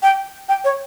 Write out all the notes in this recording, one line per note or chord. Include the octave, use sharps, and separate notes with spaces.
G5
G5
C#5